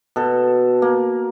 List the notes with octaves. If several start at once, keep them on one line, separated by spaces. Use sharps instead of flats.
B2 A4
A#3